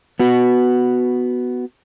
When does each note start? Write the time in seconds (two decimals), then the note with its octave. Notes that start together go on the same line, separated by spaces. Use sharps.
0.19 B3 F#4